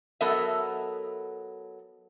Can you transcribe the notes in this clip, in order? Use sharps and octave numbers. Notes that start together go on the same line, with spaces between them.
F#3 B3 A4 A#4 D#5 E5